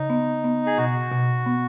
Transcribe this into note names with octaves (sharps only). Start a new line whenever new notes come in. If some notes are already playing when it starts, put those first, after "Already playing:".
Already playing: C#3 D#4
B3
B3
G#4
B2 F#4
B2
B3